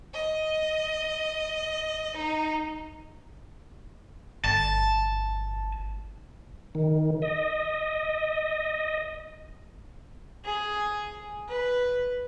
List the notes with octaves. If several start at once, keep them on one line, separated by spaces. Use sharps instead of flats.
D#5
D#4
G1 A5
D#3
D#5
G#4
B4